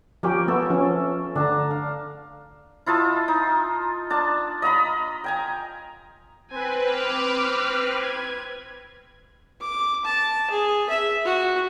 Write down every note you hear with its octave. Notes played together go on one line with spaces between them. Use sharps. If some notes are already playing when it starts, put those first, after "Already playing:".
F3 A#3 C#4 G4
A3 B3 A4 E5
F3 C#4
D3 D4 A5 A#5
F5
E4 F4 D#5 A5
D#4
D4 A5
D#5 F5 A#5 B5
G5 G#5 A#5
C4 B4 G#5
D6 F6
G#6
D6
A5
G#4
E5
F#4